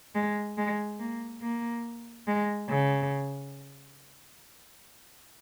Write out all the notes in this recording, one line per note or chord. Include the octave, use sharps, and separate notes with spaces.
G#3
G#3
A#3
A#3
G#3
C#3